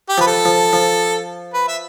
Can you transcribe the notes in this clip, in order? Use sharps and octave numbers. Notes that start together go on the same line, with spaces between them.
G4
F3 B4
A4
F3
F3
B4
E5